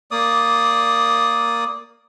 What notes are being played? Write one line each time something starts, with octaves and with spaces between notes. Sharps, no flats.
A#3 D5 D#6